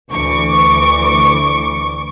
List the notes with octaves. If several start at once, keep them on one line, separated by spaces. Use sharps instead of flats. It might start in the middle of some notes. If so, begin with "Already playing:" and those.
D2 E3 C#6 D6